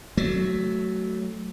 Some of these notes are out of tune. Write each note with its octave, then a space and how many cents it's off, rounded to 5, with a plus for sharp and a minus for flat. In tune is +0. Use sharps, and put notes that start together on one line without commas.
F#3 +15 A3 +0